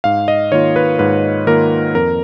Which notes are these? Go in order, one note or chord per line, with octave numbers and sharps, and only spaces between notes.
G#2 F5
D#5
D#3 A#3 F4 C#5
B4
G#2 B4
D#3 A#3 F4 A#4
F2 A#4